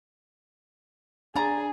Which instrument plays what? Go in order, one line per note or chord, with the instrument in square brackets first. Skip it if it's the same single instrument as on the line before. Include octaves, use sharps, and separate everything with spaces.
[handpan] D4 [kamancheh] G#4 [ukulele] D5 A#5